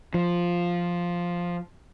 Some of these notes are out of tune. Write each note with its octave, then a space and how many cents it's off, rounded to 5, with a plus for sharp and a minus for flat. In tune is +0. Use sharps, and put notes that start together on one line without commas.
F3 +0